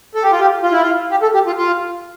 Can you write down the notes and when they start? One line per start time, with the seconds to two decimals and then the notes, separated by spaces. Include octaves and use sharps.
0.15 A4
0.23 G4
0.32 F4
0.40 G4
0.63 F4
0.72 E4
0.82 F4
1.11 G4
1.22 A4
1.34 G4
1.47 F4
1.58 F4